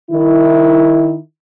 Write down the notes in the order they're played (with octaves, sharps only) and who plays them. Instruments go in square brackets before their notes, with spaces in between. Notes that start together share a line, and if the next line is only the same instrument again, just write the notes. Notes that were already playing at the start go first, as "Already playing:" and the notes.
[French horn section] D#3 E4